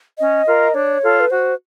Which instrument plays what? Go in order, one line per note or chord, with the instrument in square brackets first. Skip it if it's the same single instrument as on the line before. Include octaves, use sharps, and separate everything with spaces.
[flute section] C#4 [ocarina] D#5
[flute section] F4 A#4
[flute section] D4 [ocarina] C#5
[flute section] F4 A4
[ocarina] B4
[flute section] F#4 [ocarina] C5